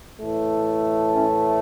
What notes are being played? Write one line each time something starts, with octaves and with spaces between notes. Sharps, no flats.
A2 E3 A3
C#4 E4